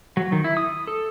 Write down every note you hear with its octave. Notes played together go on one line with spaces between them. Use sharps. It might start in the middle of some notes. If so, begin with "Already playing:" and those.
F#3
D#3
E4
D#6
A4